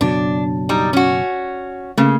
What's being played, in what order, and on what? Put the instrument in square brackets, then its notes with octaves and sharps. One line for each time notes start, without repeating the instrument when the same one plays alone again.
[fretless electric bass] F#1 B2 F#3 [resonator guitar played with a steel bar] D4
[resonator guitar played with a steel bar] G3 D#4
C#4 F#4
[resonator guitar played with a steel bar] C#3 [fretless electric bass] A3 A#3